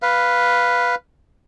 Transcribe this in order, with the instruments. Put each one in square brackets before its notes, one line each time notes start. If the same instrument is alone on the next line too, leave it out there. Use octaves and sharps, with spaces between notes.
[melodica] B4 F5